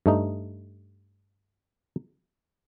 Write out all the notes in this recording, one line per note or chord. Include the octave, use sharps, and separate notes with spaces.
G2 A3 D#4